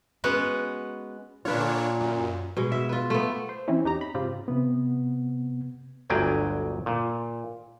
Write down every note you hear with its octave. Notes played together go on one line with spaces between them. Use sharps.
G#3 B3 C#4 F#4
A#2 D3 D4 F4 B4 C#5
F#2
B2 G#3
E5
F4 B4
A3 B3
C5
E3 C4 C#4 E4
E2 D#4 G4 A#5
B5
G#2 C#3 C4 F4 G4
C3 B3
G1 D2 F#3 G5 G#5
A#2